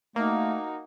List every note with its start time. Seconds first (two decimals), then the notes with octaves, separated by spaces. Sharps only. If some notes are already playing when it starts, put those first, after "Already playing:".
0.16 A3 A#3 D#4 F#4